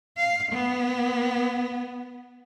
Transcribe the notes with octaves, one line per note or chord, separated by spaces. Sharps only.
F5
B3